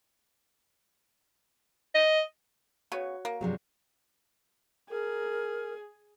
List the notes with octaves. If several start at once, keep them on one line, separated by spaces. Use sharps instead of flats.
D#5
C#3 B3 F#4 C#5
A#3 A#4
G2 C3 F3 F#3 G#4
G#4 A#4